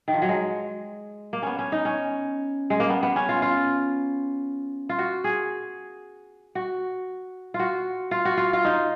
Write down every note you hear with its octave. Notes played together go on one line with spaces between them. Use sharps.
D#3
F3
F#3
G#3
A#3
B3 C#4
C#4
D#4
C#4
G#3
A#3
B3
B3
C#4
F4
F4
F4
F#4
G#4
F#4
F4
F#4
F4
F#4
F4
F4
D#4